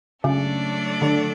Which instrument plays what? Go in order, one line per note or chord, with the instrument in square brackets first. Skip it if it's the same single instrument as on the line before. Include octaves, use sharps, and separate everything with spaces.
[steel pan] C#3 [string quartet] F#3 A3 D4 A4 D5
[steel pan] D3